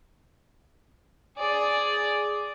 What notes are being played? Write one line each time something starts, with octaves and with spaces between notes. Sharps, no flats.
G#4 D5